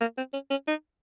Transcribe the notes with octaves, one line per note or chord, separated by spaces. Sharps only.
A#3
C4
C#4
C#4
D#4